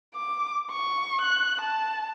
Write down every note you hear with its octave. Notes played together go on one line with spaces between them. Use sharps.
D6
C#6
F#6
A5